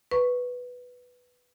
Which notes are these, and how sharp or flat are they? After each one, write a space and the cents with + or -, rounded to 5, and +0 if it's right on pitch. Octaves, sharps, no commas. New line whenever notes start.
B4 +0 C#6 +0